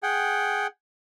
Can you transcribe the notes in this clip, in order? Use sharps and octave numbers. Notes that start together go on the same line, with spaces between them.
G#4 F#5 G5